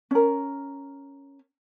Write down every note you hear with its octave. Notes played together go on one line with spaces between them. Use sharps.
C#4 A#4